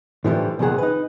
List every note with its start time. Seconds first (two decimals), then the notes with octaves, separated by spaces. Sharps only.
0.24 A2 D3 E3 F3 G3
0.59 C2 F2 A#2 D#3 G#4 F#5
0.78 D#4 B4